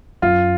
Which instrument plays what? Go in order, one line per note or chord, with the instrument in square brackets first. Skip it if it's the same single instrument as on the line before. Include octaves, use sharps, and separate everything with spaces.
[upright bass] F#2 [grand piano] F4